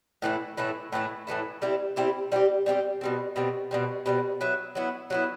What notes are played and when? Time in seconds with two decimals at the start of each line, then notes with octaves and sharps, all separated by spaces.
0.22 A2 E3 A3 E4
0.57 A2 E3 A3 E4
0.92 A2 E3 A3 E4
1.27 A2 E3 A3 E4
1.62 G3 C4 E4 G4
1.96 G3 C4 E4 G4
2.32 G3 C4 E4 G4
2.66 G3 C4 E4 G4
3.01 B2 G3 C4
3.36 B2 G3 C4
3.71 B2 G3 C4
4.06 B2 G3 C4
4.41 F#3 B3 E4
4.75 F#3 B3 E4
5.10 F#3 B3 E4